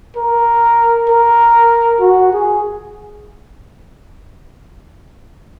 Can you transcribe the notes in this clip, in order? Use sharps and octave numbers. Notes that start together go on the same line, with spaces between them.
A#4
A#4
F#4
G#4